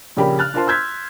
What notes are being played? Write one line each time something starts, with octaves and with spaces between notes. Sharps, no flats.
A#1 C#3 G4 A#4 B5
F6 F#6 A6
D4 F4 A#4 C5 A5 C6
C6 E6 G6 G#6 B6